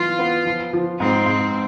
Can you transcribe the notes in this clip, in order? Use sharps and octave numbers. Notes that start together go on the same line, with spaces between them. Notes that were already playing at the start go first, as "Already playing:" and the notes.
Already playing: E3 B3 F4
B3
F3
F3
G#2 C4
G#2